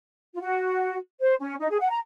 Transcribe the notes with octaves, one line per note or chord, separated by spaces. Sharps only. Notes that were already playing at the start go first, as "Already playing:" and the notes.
F4
F#4
C5
C#4
D#4
G#4
F#5
A#5